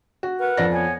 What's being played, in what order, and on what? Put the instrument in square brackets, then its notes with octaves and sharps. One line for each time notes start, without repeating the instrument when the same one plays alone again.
[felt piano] F#4
[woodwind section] A#4 B4 F#5
[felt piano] F2 D5 A#6
[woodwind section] B3 C#5 G#5